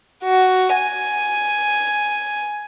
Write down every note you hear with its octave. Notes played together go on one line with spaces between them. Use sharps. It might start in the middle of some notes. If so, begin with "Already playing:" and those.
F#4
G#5